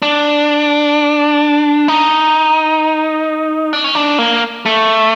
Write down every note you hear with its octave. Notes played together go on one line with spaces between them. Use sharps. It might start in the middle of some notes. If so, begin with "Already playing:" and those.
D4
D#4
D4
C#4
D4
A#3
A3